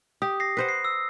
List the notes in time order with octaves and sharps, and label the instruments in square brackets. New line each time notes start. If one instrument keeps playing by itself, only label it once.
[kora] G4 [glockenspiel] D#6
[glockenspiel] A#6 C7
[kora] B4 C5 F#5
[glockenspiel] C7
E6